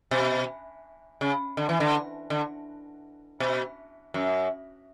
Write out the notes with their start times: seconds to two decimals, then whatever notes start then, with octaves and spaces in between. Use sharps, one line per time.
0.11 B2
1.21 C#3
1.57 D3
1.69 E3
1.80 D3
2.30 D3
3.40 B2
4.14 F#2